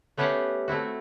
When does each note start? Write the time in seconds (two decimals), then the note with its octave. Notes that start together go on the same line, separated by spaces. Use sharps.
0.17 A3 B3 C#4 G4 F5 F#5
0.68 A3 C4 E4 F#4